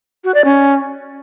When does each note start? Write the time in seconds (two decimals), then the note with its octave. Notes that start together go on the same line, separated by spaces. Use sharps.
0.24 F#4
0.34 D5
0.45 C#4